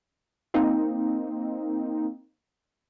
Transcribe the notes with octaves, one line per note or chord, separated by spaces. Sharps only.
A#3 C4 D#4